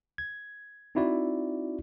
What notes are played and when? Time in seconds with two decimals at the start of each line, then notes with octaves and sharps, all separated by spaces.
0.18 G#6
0.95 C4 D#4 E4 F#4 D5